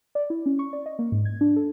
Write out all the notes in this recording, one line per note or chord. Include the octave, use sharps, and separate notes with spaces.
D5
E4
C#4
C#6
D5
D#5
A#3
G#2
G#6
D4
A4